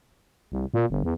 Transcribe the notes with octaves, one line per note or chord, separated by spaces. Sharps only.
C2
A#2
G1
E2